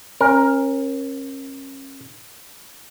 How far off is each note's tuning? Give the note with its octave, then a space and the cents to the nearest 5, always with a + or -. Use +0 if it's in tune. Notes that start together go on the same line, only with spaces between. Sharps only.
C#4 -35 A#4 +10